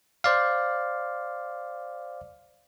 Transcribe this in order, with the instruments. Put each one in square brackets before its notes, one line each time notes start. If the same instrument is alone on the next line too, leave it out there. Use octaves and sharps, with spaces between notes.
[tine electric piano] C5 D5 F5